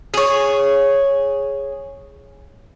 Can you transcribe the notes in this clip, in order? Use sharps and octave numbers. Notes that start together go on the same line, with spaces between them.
G#4 C#5